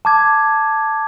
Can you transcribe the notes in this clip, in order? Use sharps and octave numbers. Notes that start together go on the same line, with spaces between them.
A5 D6 G#6